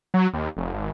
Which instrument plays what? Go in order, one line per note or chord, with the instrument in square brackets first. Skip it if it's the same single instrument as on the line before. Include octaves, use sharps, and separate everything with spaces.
[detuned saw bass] F#3
D#2
F1
G#1